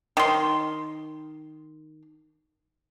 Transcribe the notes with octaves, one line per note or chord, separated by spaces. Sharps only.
D#3 C6